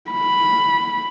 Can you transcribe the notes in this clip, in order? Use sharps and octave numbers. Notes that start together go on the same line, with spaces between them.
B5